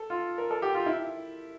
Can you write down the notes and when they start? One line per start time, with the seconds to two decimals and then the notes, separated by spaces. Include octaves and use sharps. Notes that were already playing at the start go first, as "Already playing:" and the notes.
Already playing: A4
0.10 F4
0.38 A#4
0.51 A4
0.62 G4
0.75 F4
0.86 E4